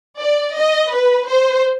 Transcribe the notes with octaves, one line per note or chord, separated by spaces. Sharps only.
D5
D#5
B4
C5